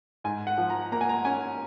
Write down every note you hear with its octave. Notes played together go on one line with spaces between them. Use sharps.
G#2 G#5
F#5
F3
A#5
A#3 A#5
G#5
A#5
C#4 G#5